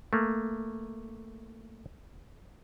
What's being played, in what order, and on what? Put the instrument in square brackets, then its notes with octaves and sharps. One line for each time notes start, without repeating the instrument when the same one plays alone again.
[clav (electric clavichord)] A3 A#3